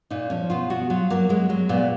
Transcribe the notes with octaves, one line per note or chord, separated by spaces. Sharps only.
A#2 D#4
F3 C#4
B2 F4
B2 F#4
F#3 F4
F#3 A#3
F#3 G#3
F#3 G#3
A#2 B3